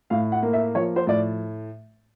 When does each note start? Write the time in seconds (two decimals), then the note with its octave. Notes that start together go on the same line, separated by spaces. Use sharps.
0.10 A2 F5
0.32 F#5
0.43 A#3
0.53 E5
0.75 F3 C#5
0.96 C5
1.07 A2 D5